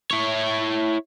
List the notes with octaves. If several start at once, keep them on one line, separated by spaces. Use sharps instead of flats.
E4 C#5